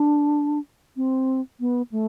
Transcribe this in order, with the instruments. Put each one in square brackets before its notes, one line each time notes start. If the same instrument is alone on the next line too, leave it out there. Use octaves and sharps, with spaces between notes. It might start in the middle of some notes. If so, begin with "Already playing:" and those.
Already playing: [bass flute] D4
C4
B3
A3